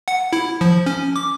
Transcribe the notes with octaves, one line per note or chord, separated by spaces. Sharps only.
F#5
E4
F3
C#4
D6